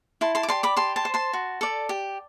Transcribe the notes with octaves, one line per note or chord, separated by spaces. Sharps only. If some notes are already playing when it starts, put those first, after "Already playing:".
E4 A5 C6
A5 C6
D6
G4 D5 A5 C6
B5 D6
G4 A5 C6
A5 C6
C5
A5 C6
F#4
A4 D5
G4